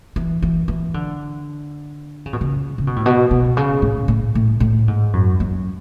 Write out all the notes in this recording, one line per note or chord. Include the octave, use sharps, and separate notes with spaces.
E3
E3
E3
D3
C#3
B2
C#3
C#3
B2
A2
B2
B2
C#3
A2
A2
A2
A2
G#2
F#2
F#2